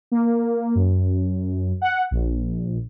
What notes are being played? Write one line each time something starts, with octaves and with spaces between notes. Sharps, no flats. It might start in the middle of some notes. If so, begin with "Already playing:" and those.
A#3
F#2
F#5
A#1